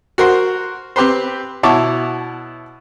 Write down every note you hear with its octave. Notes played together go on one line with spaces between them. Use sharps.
F#4 A#4 C5
C4 G4 B4 C5
B2 E4 C#5 A5 D6